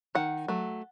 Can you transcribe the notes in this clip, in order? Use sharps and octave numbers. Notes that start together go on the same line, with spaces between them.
D#3 F#5
F#3 A3